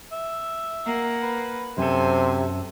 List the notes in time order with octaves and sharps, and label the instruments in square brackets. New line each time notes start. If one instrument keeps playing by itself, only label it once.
[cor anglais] E5
[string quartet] A#3 F#5
[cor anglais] B4
[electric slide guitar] F#2 A4 [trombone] C3 [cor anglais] C5 [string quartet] G#5